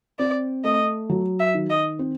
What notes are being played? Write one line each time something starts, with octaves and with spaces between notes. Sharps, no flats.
C4 D5
A3 D#5
F#3
E5
D#3
D#5
C4